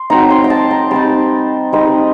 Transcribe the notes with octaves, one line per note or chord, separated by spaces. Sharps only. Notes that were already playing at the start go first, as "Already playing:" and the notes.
Already playing: C6
F#3 C4 D#4 A#5
C6
G5
A5
A#5
G3 C4 D#4 A5
G3 C4 D#4 D#5